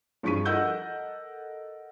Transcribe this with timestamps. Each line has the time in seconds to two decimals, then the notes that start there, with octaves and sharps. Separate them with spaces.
0.23 G2 F3 G#4 C#6 B6 D#7
0.46 A4 A#4 D#5 F#5 E6 G6